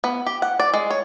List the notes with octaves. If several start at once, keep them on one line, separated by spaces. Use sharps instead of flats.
B3
G4
F#5
D5
G#3
C#5